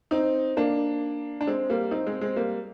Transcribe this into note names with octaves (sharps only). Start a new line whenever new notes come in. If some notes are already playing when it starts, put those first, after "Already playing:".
C4 D#4
A#3 D4
D4
G#3 C4
G3 A#3
C4 D#4
G#3 C4
G#3 C4
G3 A#3